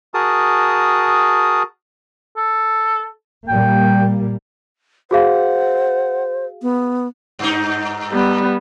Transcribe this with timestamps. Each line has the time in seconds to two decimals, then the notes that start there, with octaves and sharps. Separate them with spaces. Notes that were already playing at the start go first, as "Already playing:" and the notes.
0.14 F#4 G#4 A#4 A5 D#6
2.37 A4
3.48 A#2 G3 A#3 G5
5.11 F#4 G#4 C5 F5 F#5
6.62 B3
7.39 G2 D#4
8.11 G3 B3